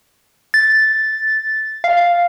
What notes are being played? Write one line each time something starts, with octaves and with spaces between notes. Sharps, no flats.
A6
F5